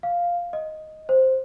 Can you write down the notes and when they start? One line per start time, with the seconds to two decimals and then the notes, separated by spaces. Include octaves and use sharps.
0.03 F5
0.53 D#5
1.09 C5